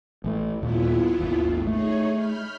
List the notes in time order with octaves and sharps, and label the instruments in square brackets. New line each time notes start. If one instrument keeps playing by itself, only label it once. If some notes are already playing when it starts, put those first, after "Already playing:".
[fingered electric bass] A1 A3
[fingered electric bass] D#2 A#2 [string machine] B3 E4 F4
[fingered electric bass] G#1 D#2
[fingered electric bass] A3 [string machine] D#4 G#4 C#5
[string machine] B5 F6 G6